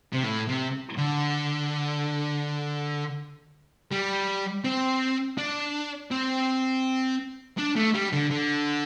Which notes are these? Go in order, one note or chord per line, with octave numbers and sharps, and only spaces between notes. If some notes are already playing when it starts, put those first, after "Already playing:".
C3
A2
C3
D3
G3
C4
D4
C4
D4
A3
G3
D3
D3